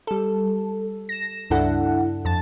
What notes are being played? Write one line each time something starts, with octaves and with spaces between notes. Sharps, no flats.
G3 A4
A#6 E7
C#2 G2 D4 E4 A4 F#5
F2 A5 A6